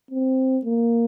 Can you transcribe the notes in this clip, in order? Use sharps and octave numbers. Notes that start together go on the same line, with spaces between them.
C4
A#3